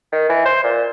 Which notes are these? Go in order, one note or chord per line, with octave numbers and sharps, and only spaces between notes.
D#3
E3
C5
A#2